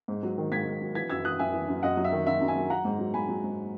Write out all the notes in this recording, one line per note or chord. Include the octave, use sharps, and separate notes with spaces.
G#2
F#3
D#3
G#2 G#6 B6
G#2
F#3
E3 G#6 B6
F#2 E6 G#6
E3 D#6 F#6
F#2 E5 G#5
E3
F#2
F#2 D#5 F#5
F#3
E5
D#3
F#2 E5
F#2
E5 G#5
F#3
F#3 F#5 A#5
G#2
F#3
G#2 G#5 B5
F#3
G#2